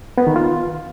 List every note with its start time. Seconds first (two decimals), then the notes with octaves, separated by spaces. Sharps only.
0.18 B3
0.27 D#3
0.36 F4